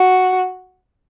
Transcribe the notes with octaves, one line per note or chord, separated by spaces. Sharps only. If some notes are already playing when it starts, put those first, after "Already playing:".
Already playing: F#4